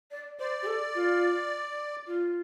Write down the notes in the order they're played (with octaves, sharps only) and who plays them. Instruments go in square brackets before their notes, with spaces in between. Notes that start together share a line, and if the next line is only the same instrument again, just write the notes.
[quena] D5
[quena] C5 [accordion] D5
[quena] G4
A4
F4
F4